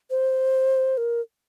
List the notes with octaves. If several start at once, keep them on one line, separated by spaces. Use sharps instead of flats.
C5
A#4